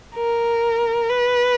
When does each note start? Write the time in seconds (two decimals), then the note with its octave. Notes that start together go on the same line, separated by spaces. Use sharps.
0.16 A#4
1.09 B4